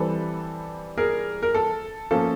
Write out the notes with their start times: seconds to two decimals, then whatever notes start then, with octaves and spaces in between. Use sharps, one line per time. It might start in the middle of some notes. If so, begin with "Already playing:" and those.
Already playing: E3 G3 C4 A4 B4
0.98 G#4 A#4
1.42 A#4
1.54 A4
2.11 F3 A#3 C#4 A4